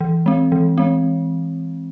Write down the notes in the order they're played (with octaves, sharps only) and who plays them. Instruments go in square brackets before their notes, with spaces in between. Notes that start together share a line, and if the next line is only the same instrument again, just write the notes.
[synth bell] E3
G#3 C4
E3
G#3 C4